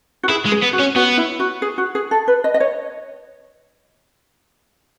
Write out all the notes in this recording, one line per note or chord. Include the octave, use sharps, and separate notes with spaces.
F#4
E4 G#4
G#3
G#4
B3
F#4
C#4
B3 F#4
E4
F#4
G#4
F#4
G#4
A4
B4
D#5
D#5
C#5